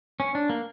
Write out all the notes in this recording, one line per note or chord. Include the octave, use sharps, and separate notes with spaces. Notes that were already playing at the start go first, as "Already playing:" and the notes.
C#4
D4
A#3